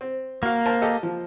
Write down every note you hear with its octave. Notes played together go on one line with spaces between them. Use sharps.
C4
A#3 F#4 F5
A#4 C5 A5
G4 A4 D#5
F3